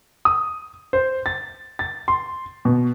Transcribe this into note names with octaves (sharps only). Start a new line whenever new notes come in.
D#6
C5
A6
A6
C6
B2